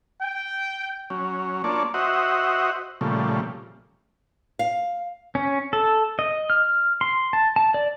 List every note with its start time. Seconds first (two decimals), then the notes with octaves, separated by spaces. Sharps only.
0.22 G5
1.10 F#3 C#4
1.64 A#3 D4 F4 C#5 D5 A5
1.94 F#4 C5 D#5 E5 F#5
3.01 A#2 C#3 F3 G3 A3
4.59 F5
5.35 C#4
5.73 A4
6.19 D#5
6.50 F6
7.01 C6
7.33 A5
7.56 A5
7.74 D5